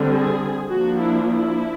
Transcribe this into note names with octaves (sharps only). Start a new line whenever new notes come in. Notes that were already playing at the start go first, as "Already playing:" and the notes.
Already playing: D3 G3 C4
G#4
F3 A#3 D4 F#4
E4
E4